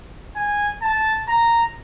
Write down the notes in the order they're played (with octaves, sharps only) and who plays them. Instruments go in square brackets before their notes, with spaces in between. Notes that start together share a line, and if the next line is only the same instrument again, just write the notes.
[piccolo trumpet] G#5
A5
A#5